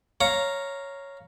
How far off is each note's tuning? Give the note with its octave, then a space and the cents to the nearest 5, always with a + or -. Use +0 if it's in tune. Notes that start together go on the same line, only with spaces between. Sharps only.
C#5 +0 F5 -5 A#5 +0